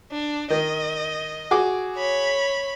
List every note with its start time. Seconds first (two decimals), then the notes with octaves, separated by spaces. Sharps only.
0.11 D4
0.50 D#3 D#5
1.51 F#4 G#4 D6
1.97 C#5 B5